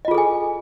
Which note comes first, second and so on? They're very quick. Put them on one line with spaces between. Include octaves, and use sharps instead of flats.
D#5 F4 G#4 A4 G#5